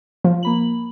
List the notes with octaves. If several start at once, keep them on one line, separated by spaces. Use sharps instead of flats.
F3
A#3 B5 F#7